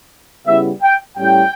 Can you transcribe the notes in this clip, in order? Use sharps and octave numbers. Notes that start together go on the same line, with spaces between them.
C#3 G3 B3 E4 E5
G5
A2 G3 C#4 E4 G5